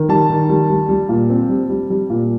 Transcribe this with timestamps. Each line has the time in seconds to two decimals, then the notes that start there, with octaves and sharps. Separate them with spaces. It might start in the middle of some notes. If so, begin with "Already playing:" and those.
Already playing: D#3
0.09 G3 A5
0.30 D#3
0.49 G3
0.70 G3
0.89 G3
1.09 A#2
1.30 C4
1.49 G3
1.70 G3
1.90 G3
2.10 A#2